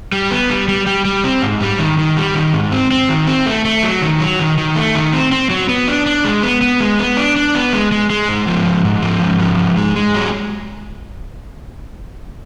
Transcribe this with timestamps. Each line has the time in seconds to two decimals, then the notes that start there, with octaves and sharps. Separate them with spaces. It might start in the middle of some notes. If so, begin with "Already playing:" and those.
0.12 G3
0.31 B3
0.50 G3
0.68 G3
0.86 G3
1.05 G3
1.24 C4
1.42 G#2
1.60 G3
1.79 D#3
1.98 D#3
2.17 G3
2.35 D#3
2.53 G#2
2.72 C4
2.91 C4
3.09 D#3
3.27 C4
3.46 A3
3.65 A3
3.83 F#3
4.02 D#3
4.20 F#3
4.39 D#3
4.58 D#3
4.76 A3
4.95 D#3
5.13 C4
5.32 C4
5.50 F#3
5.69 B3
5.88 D4
6.06 D4
6.24 G#3
6.43 B3
6.61 B3
6.80 G#3
6.99 B3
7.17 D4
7.36 D4
7.55 B3
7.73 G#3
7.92 G#3
8.10 G#3
8.29 G#2
8.47 F3
8.66 G#2
8.85 G#2
9.02 F3
9.22 G#2
9.40 F3
9.59 G#2
9.77 G#3
9.96 G#3
10.14 F#3